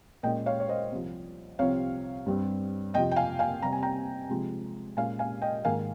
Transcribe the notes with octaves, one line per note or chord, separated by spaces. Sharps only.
A#2 G#3 C#4 D#5 G5
C#5 F5
C#5
C5 D#5
C2 C3 F3
C2 C3 F3 C4 C#5 F5
G2 G3 C4
F2 C3 F3 D#5 G5
G5
F5 G#5
F5 G#5
C3 G3 C4 A#5
G#5
G5 A#5
C3 F3 G#3 C4
A#2 G#3 C#4 F5 G#5
F5 G#5
D#5 G5
G#2 D#3 A#3 F5 G#5